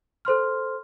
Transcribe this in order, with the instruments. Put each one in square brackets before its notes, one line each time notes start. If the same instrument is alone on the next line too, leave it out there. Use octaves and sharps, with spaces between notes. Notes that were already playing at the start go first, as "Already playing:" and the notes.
[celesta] A4 C5 C6 F6